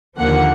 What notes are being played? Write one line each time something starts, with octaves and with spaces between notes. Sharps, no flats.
D#2 D3 F3 A#3 F#5